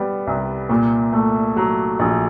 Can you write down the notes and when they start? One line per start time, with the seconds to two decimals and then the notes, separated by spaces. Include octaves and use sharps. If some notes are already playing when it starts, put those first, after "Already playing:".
Already playing: G3 B3
0.27 C2
0.69 A#2
1.13 A3
1.56 F#3
1.99 A#1